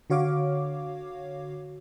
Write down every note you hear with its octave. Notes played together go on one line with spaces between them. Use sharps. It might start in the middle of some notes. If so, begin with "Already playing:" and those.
D3 F#4 C#5 F5 D6